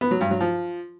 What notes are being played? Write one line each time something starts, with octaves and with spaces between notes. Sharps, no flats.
B3
F#3
G2
F#3
F3